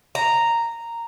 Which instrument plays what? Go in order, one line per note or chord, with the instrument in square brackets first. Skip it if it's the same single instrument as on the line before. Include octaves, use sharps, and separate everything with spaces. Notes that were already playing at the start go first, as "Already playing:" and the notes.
[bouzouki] A#5